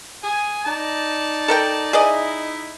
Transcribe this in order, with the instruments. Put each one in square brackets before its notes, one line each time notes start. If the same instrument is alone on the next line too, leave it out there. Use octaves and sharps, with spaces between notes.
[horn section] G#4 G#5
D#4 D5 A5
[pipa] A4 A#4 G5
[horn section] D#4 E4 [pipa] G#4 D5 D#5